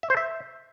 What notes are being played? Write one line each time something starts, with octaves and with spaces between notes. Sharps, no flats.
E5
C5
E5